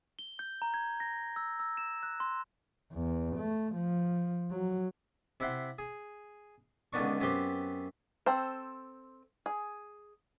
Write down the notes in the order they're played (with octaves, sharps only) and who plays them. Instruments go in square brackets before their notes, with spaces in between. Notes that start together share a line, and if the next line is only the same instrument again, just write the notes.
[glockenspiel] G7
G6
A#5
G#6
A#6
E6
E6
E7
F#6
C6
[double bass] E2
A3
F3
F#3
[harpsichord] C3 E4 E5 F#5 C6
G#4
C#2 D3 D#3 B3 D4 C#6
F#2 B3 C4 G4 G5 C6
[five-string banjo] C4 A4 C5
G#4